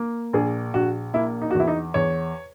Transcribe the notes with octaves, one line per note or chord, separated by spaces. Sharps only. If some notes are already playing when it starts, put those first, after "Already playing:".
Already playing: A#3
A#1 G#4
A#1 F#4
A#3 E4
D#4
F#4
E2
E4
D#4
E2 C#5